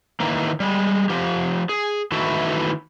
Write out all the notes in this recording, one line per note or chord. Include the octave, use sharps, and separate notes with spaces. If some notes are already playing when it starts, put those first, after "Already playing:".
D#3 E3 A#3
G3 G#3
F3 G4
G#4
D#3 E3 A3 E4 F#4